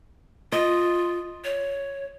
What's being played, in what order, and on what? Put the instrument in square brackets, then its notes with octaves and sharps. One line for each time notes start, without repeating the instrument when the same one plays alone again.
[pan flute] F4 [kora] D#5
[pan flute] C#5